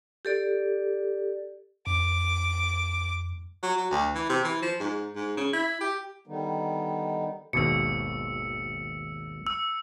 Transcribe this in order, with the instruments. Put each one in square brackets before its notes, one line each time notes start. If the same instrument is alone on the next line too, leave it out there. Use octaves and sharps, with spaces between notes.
[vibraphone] G4 A4 D5
[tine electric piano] F2 [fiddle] D6
[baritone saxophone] F#3
F#3
D2
E3
C3
E3
F3
G#2
G#2
C#3
E4
G4
[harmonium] D3 D#3 G3 B3 D#4
[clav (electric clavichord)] G#1 D#2 B2 [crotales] E6 C#7
[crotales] E6